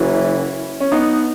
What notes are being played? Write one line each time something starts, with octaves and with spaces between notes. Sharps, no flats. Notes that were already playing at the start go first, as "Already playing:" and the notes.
Already playing: F#1 F#2 E3 C#4 E4
C#4
B3 D#4